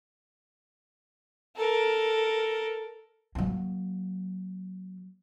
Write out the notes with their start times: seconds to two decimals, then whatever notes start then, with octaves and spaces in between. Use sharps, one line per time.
1.56 A4 A#4
3.35 F#3 A#3